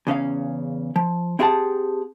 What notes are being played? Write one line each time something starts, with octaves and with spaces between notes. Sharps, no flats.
E2 C#3 C#4 F5
F3
C4 E4 G4 G#4 F#5 A5